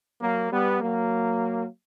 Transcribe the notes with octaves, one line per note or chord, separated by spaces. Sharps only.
F#3 A#3
G3 B3
F#3 A#3